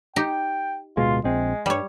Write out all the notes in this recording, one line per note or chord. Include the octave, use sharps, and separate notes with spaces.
D#4 G4 G5
D1 B2 G#3 F4
A#1 G#3 C4
G2 G3 C#5